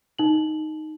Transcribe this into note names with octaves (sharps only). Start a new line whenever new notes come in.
D#4 F#7